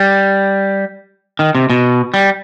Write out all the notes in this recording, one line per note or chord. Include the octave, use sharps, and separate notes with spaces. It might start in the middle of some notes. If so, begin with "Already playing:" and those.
Already playing: G3
D#3
C3
B2
G3